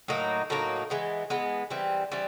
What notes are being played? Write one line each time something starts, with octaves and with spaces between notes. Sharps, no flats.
A2 F#3 A#3 D#4
A2 F#3 A#3 D#4
E3 G#3 B3
E3 G#3 B3
E3 G3 C4
E3 G3 C4